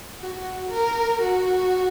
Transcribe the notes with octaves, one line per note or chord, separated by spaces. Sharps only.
F#4
A#4
F#4